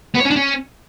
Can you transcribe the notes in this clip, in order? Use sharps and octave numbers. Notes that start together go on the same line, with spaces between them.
B3
C#5
C#4
D4
C#4